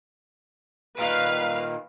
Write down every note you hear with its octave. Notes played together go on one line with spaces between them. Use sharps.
A#2 D#3 B4 F5